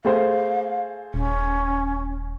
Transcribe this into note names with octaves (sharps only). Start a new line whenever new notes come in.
A3 G#4 C5 F5
D#1 C#4